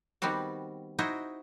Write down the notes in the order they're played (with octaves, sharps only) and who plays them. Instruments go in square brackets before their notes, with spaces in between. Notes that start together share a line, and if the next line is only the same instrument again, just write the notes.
[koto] D#3 G3 B3 C4 F#4
D#4 E4 F#4 C5 D#5